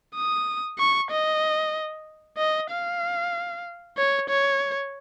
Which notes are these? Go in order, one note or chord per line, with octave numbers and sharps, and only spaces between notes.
D#6
C#6
D#5
D#5
F5
C#5
C#5